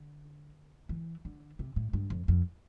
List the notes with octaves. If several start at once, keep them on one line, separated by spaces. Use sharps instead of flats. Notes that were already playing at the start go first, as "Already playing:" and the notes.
Already playing: D3
E3
D3
C3
A2
G2
F2
F2